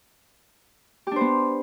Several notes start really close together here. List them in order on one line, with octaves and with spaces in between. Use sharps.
G4 D4 C5 B3